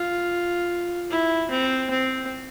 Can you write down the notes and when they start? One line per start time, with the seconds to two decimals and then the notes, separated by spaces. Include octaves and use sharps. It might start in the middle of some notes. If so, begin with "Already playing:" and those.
Already playing: F4
1.10 E4
1.50 C4
1.90 C4